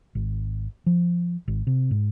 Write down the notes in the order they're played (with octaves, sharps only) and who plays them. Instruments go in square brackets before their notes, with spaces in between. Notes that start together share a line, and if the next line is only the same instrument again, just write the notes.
[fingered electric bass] G#1
F3
G#1
C3
G#2